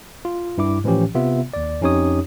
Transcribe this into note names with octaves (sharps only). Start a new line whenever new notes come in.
F4
G2 E4 D6
A2 E3 F3 C#4 G4
C3 B3 F4 E5
D#2 D5
F2 C#4 D#4 G4 C#5 D#6